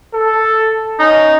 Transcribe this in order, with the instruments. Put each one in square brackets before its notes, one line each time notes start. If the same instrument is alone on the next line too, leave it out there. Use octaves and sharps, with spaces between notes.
[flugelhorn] A4
[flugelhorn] C#4 [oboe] D#4